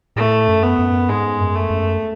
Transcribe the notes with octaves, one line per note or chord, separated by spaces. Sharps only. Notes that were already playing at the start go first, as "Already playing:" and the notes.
A2 A3
F#2
B3
F#2
G#2 G#3
F#2
A3
F#2